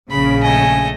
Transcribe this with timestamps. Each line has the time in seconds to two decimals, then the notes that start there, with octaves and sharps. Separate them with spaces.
0.11 A#1 C#3 B5
0.43 A3 D#5 G#5